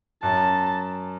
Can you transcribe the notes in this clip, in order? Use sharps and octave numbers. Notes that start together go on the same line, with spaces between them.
F#2 A5